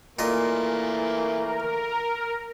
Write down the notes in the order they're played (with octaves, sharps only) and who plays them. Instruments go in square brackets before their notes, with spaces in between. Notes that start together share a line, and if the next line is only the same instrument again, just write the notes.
[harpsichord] A#2 F4 D#5 [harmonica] E3 A3 A#3
[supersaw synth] A#4